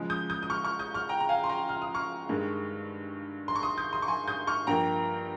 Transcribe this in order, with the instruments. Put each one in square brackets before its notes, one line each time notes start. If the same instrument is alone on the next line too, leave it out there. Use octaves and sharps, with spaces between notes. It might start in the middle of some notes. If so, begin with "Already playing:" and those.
Already playing: [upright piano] C#3 F3 G#3
D#6 G6
D#6 G6
D#6
C#6 F6
C#6 F6
D#6 G6
C#6 F6
G5 A#5
A#5
F5 G#5
C6
G5 A#5
F6
D#6
C#6 F6
G2 D#3 G#3
C6
C#6
C6 D#6
D#6 G6
C6 D#6
C#6
G#5 C6
D#6 G6
C#6 F6
G2 F3 A#3 G5 A#5